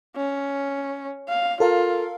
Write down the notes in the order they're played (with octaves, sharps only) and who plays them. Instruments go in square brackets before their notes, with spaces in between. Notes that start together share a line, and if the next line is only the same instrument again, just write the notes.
[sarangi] C#4
F5
[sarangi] F4 [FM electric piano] A4 A#4 F5